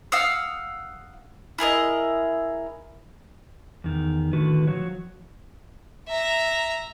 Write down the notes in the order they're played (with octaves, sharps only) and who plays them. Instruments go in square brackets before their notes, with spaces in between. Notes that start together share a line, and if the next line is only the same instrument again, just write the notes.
[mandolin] F5 F#5 D#6 E6
E4 G#4 A#4 D#5
[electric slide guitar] E2 D#3
A2 D3 D#3 F#4 B4
F3 F#3 F#4 C#5
[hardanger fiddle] E5 A#5